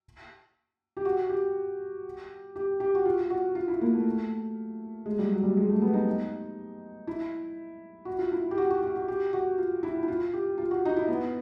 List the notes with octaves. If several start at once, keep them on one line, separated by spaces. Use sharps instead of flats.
G4
F#4
G4
G4
G4
F#4
F4
F#4
F4
E4
A#3
A3
G#3
G3
F#3
G3
G#3
A3
B3
D#4
E4
F#4
F4
E4
G4
F#4
F#4
F#4
F#4
G4
F#4
F4
E4
E4
F4
G4
F4
F#4
D#4
E4
B3